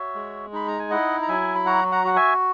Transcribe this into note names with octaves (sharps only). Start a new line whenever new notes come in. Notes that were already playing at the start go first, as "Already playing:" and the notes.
Already playing: F#4 C#5 E5
G#3
D#4 B5
A#5
G#5
E4 D#5 F#5
A#5
F#3 E5 G#5
B5
F#4 F#5 A#5
F#5 A#5
F#4 F#5
E5 G#5